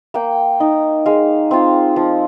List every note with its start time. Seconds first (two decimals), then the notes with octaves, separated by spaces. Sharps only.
0.14 A#3 G5
0.60 D#4
1.06 G#3 F5
1.51 C4 F4
1.96 F3